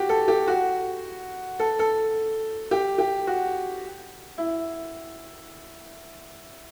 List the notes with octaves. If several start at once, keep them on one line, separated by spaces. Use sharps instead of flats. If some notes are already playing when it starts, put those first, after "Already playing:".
Already playing: F#4 G4
A4
G4
F#4
A4
A4
G4
G4
F#4
E4